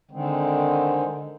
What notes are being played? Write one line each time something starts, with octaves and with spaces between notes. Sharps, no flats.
D3 D#3 G#3 C4